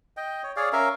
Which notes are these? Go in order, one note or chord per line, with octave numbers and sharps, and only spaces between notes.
D#5 G5
C#5
G#4 C#5 D5 F5
C#4 A#4 E5 F5